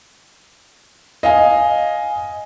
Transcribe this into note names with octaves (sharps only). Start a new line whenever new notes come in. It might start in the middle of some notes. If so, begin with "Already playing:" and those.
D#5 F5 G#5